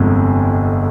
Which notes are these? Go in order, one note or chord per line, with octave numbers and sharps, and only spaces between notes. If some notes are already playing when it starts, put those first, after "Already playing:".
Already playing: G1 F2 C3 F3 G#3